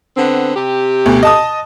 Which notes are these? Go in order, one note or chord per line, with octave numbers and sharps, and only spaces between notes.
D3 B3 C4
C3 G4
D2 B2
D#5 A5 D#6